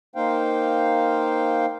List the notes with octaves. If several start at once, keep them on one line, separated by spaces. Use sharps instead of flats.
A#3 D#4 C5 F5 G5